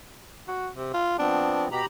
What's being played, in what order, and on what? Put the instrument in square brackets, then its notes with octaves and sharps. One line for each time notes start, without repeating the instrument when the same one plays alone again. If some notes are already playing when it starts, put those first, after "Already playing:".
[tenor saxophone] F#4
C3
F4
[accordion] F3 B3 C4 [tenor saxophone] D4
[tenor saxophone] B2 [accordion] G4 A#5 B5